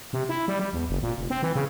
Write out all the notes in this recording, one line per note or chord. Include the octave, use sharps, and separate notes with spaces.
C3
E4
G3
G3
E2
F#1
A#2
F1
C4
E3
C#3